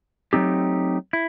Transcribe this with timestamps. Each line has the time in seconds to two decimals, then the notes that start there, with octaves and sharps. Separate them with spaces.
0.33 F#3 A3 C4 D#4 G4
1.13 E4